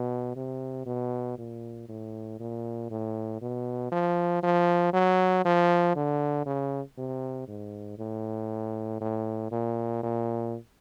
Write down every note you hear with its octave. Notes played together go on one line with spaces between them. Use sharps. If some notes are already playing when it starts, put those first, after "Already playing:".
Already playing: B2
C3
B2
A#2
A2
A#2
A2
B2
F3
F3
F#3
F3
D3
C#3
C3
G#2
A2
A2
A#2
A#2